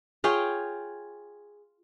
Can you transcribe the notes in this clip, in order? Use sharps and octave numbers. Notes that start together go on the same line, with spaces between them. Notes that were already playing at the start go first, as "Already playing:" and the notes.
F4 G#4 C#5 G5